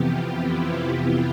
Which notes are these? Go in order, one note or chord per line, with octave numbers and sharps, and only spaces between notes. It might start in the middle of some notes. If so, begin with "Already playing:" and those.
Already playing: F2 C3 E3 B3 F4 G4
E4